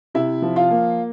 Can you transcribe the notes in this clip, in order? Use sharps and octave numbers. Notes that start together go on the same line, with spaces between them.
C3 E4 E5
F3
F4 F5
A#3